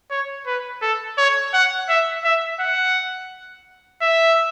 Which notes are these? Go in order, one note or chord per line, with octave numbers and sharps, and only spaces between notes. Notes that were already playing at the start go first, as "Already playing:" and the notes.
C#5
B4
A4
C#5
F#5
E5
E5
F#5
E5